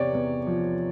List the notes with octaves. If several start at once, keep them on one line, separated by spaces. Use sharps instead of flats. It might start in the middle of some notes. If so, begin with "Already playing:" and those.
Already playing: E2 C3 C#5 D5
E2
F3